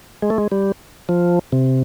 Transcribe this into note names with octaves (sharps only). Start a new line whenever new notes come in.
G#3
A3
G#3
G3
F3
C3